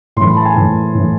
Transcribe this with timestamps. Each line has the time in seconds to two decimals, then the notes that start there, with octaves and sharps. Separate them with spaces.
0.17 A2 E3 C6
0.27 B5
0.36 A5
0.46 G#5
0.56 A2 E3
0.95 A2 E3